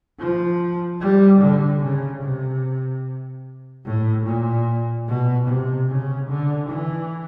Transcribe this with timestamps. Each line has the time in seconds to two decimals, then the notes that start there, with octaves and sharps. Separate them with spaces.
0.20 F3
1.01 G3
1.42 D3
1.82 C#3
2.23 C3
3.85 A2
4.26 A#2
5.08 B2
5.48 C3
5.89 C#3
6.29 D3
6.70 E3